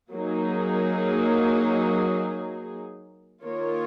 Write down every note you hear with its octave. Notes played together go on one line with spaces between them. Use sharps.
F#3 A#3 D#4 G#4
D#3 A#3 F4 A#4 C#5